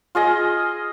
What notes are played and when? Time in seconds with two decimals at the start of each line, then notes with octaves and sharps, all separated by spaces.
0.15 F4 G#4 D#5